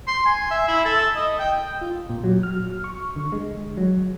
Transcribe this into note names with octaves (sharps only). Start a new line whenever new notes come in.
C6
G#5
E5
E4
A4
D#5
G5
F4
A#2
F#3
F6
C#6
D3
G#3
F#3